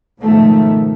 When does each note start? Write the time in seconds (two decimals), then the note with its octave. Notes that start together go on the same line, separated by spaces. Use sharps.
0.20 G#2 B2 D#3 F3 A3